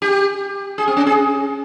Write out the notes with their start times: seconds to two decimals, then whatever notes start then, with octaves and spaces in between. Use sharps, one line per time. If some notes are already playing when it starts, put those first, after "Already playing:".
0.02 G4
0.78 G#4
0.88 C4
0.97 C#4
1.07 G#4